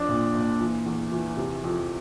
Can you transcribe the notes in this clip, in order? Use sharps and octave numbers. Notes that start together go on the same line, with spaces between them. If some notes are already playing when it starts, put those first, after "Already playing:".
Already playing: F2 D4
A#2
A#2
E3
E2
E3
C3
F2